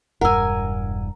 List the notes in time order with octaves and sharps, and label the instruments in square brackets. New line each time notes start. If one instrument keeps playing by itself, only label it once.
[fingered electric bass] E1 G2 [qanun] A#4 G#5 [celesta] F#5 E6